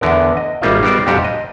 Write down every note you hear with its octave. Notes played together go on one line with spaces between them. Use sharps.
E2 D3 B3 A#4
D#5
G#1 G3 A#3 D#4 F4 E5
G3 B3 D#4 A#4 C5 D5
F2 A#2 G3 D4 F#4 G4
D#5